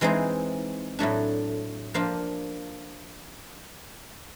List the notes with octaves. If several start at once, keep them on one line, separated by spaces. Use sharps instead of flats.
E3 G#3 C4 D#4
A2 F#3 A3 D4
F3 A#3 D4 F4